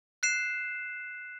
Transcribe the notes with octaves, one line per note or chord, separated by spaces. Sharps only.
F#6 C7 E7